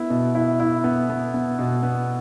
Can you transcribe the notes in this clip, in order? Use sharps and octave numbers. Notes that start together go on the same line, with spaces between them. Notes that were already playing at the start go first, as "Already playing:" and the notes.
Already playing: B3 E4
B2
E4
E4
B3
B3
B3
B2
B3